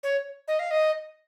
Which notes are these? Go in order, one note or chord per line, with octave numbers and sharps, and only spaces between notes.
C#5
D#5
F5
D#5